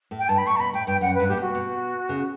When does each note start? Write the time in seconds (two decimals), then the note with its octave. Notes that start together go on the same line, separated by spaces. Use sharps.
0.11 A2
0.19 G5
0.28 G2 A5
0.38 B5
0.47 A2 C#6
0.56 A5
0.60 B2 B5
0.74 A2 G5
0.87 G2 G5
1.01 F#2 F#5
1.15 B4
1.20 G2
1.28 A2 G4
1.37 B2 F#4
1.55 B2
2.09 C#3